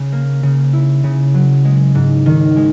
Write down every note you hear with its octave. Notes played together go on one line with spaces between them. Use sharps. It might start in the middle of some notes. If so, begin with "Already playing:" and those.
Already playing: C#3
A#3
C#3
E4
C#3
F#3
G#3
G#2
D#3
G#3